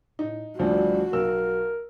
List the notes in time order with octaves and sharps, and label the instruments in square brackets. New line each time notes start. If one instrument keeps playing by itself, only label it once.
[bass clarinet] A2 [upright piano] D#4
[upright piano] D2 F3 D4 [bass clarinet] G3 [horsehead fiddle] F#4
[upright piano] B1 E6 [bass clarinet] A#4